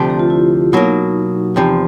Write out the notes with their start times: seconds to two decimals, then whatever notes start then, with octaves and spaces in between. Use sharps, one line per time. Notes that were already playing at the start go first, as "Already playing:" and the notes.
Already playing: D2 C3 F3 A3 D4
0.10 G4
0.19 F4
0.30 E4
0.73 B2 F#3 A#3 D#4
1.56 E2 C3 F3